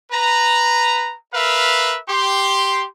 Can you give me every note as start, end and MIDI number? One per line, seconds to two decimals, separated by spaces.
0.12 1.14 71
0.12 1.14 82
1.34 1.97 70
1.34 1.97 71
1.34 1.97 76
1.34 1.97 77
2.08 2.85 67
2.08 2.85 84